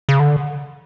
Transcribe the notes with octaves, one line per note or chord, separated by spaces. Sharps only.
C#3
D3